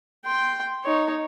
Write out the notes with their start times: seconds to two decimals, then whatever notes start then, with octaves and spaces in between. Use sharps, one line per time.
0.25 G5 C6
0.84 D#4 C#5